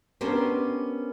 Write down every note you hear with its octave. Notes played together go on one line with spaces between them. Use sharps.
B3 C#4 D4 G4 A#4 C5